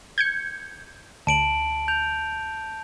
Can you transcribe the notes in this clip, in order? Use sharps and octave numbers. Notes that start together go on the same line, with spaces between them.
G6 G#6 C#7
D2 A5 D7 F#7
G6 F7